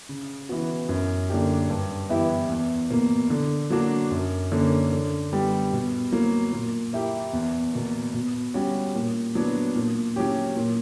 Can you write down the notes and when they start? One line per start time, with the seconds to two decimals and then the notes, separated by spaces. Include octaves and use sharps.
0.09 C#3
0.49 E3 B3 F#4
0.89 F#2
1.30 D3 A#3 D4 G4
1.70 G2
2.09 E3 B3 E4 G4
2.50 E2
2.90 B2 A#3
3.30 D3
3.70 F#3 A#3 D4 F#4
4.11 F#2
4.52 D3 A#3 C#4
4.92 D3
5.33 G3 B3
5.73 B2
6.12 F#3 A#3
6.53 A#2
6.93 A#3 E4 G4
7.33 E2
7.74 B2 A#3
8.14 B2
8.54 G3 C#4 F#4
8.95 A#2
9.35 F#3 B3 D4
9.75 A#2
10.16 F#3 C#4 G4
10.56 A#2